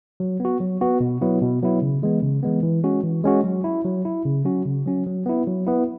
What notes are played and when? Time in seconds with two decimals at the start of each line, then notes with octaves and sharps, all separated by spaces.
0.20 F#3
0.40 B3 F#4
0.60 F#3
0.81 B3 F#4
1.01 B2
1.22 F#3 B3 E4
1.42 B2
1.62 F#3 B3 E4
1.82 C#3
2.02 E3 G#3 B3
2.22 C#3
2.43 E3 G#3 B3
2.63 E3
2.83 G#3 C#4 F#4
3.04 E3
3.24 G#3 C#4 F#4
3.44 F#3
3.64 E4
3.85 F#3
4.05 E4
4.25 C#3
4.45 F#3 C#4 F#4
4.66 C#3
4.86 F#3 C#4 F#4
5.06 F#3
5.26 B3 E4
5.47 F#3
5.67 B3 E4